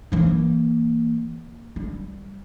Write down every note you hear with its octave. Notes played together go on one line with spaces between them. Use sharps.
E3 A#3
G3